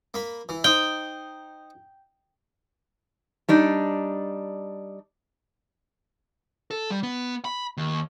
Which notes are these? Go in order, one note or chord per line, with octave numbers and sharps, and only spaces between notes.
A#3 B5
E3
D#4 C5 G5 D#6
G3 D4 D#4
A4
G3
B3
B5
D#2